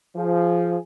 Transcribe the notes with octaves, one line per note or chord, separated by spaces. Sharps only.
F3 G#4